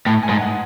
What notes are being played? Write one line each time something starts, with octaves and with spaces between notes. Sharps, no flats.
A2 A5
G#5
G#2
F#5